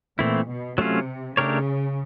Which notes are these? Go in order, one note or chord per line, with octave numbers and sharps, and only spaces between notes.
A#2 E3 A3 C4 E4
B2
C3 F#3 A3 C#4 F4
C#3 A3 D4 G4 A#4 C#5